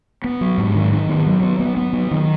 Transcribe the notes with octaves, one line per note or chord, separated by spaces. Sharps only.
B3
F#3
G#2
D#3
D#3
B3
F#3
B3
B3
B3
F#3
D#3